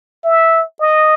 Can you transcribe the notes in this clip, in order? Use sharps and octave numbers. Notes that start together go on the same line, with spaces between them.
E5
D#5